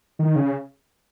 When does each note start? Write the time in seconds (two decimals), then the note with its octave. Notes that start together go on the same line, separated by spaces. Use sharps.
0.19 D#3
0.36 C#3